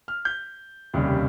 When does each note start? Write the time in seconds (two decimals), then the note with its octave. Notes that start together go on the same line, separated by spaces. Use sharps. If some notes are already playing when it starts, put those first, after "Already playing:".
0.08 F6
0.25 G6
0.94 F1 D#2 C#3 G3